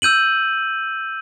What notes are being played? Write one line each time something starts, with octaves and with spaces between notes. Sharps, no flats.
E6 G6 D#7 F#7